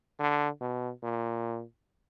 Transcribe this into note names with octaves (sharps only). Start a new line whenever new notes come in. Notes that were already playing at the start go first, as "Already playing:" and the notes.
D3
B2
A#2